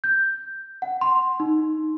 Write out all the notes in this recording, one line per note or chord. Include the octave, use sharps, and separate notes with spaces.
G6
F#5
C6
D#4